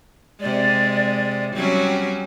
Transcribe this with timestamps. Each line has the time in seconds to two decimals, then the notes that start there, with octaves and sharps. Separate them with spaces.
0.40 C3 G#3 D5
1.56 F#3 G3 C4 C#4